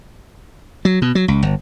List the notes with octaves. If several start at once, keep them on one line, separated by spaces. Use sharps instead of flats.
F#3
B2
F#3
C#2
G1